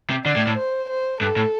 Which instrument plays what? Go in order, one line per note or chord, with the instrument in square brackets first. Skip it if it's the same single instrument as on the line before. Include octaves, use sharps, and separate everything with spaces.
[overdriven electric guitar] C3
[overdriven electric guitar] D3 [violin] D5
[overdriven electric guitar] A2
A2
[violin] C5
C5
[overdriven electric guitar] G2 [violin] A4
[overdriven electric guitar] A2